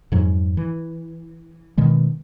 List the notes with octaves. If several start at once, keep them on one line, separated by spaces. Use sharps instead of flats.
F2 G#2 F#3
E3
B2 D#3 G#3